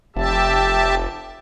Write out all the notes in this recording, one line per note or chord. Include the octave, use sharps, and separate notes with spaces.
F1 G4 E5 A5